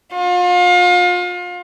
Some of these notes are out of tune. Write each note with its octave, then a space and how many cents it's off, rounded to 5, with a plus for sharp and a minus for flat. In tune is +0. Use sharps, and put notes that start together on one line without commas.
F4 +35